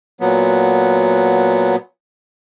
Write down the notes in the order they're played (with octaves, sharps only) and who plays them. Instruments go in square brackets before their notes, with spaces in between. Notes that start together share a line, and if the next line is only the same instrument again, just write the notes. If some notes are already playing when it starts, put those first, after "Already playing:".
[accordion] A#2 F#3 B3